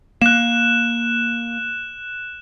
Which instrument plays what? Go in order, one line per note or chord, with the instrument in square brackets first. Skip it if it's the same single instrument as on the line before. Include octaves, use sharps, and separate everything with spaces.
[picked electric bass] A#3 [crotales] F#6 E7